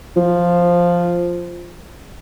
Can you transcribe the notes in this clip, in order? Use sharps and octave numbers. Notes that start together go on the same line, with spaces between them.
F3